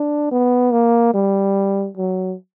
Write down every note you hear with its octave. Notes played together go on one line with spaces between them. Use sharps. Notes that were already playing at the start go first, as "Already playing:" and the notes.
Already playing: D4
B3
A#3
G3
F#3